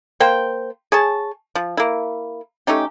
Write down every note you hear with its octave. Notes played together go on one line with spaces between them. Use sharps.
A#3 C5 G5
G#4 C#5 A5
F3
A#3 E4
A3 C#4 D#4 G4